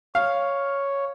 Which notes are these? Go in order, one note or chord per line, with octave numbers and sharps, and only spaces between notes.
C#5 F5